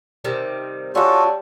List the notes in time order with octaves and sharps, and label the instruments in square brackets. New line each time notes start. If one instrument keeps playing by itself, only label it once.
[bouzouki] C3 D#3 G3
[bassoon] G3 [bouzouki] C#4 D4 [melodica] F4 F#4 A4